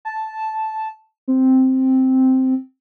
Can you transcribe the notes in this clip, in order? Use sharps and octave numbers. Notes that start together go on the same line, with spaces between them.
A5
C4